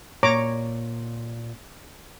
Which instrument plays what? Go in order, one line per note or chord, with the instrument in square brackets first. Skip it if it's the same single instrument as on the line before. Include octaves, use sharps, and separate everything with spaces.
[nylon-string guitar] A#2 [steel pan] C#5 A#5 D6